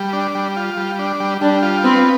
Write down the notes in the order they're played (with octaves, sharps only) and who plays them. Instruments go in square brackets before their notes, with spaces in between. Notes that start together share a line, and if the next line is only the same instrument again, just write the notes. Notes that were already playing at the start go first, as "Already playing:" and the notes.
Already playing: [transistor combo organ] G3
D4
G3
F4
G3
D4
G3
[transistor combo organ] G3 [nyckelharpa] D4
[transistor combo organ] F4
[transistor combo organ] B3 [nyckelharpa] C4